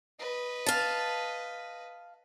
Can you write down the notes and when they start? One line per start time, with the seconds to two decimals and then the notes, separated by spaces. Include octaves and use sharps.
0.19 B4 D#5
0.66 F5 A5